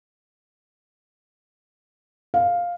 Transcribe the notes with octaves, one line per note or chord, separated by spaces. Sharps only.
F5